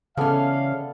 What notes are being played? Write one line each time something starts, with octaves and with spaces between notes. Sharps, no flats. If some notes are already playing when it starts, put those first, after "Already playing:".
C#3 E3 B3 C#4 A4 D5 F5